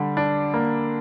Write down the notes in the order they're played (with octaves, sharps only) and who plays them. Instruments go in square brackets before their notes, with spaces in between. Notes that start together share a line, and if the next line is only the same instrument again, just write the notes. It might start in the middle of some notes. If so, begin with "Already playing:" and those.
Already playing: [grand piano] D3 G3
D4
A#3